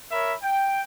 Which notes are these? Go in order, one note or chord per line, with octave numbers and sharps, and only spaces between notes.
A#4 C#5 E5 B5
G5